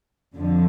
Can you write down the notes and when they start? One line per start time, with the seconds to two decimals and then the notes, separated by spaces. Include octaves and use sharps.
0.35 F2 D3 F3